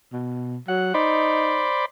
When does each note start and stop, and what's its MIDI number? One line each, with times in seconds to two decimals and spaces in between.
0.13 0.57 47
0.68 0.90 54
0.68 0.94 78
0.94 1.68 63
0.94 1.85 72
0.94 1.85 74
0.94 1.85 83